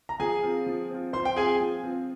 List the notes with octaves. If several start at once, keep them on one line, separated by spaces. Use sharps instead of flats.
A#5
F3 G#4 G#5
C4 F4
F3
C4 F4
F3 C5 C6
G5
C4 F4 G#4 G#5
F3
C4 F4